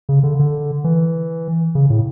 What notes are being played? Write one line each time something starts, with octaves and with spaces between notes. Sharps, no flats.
C#3
D3
D3
E3
C#3
A2